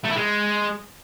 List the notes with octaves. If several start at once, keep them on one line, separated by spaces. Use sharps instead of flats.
A3
E4
G#3